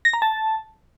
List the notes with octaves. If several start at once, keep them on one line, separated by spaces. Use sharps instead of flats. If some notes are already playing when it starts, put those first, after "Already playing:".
A#6
A#5
A5